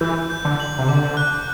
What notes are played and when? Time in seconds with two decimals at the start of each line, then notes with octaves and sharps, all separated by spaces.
0.01 E3 G6
0.30 G6
0.45 D3
0.60 F#7
0.79 C3
0.89 D3 D6
1.17 F#6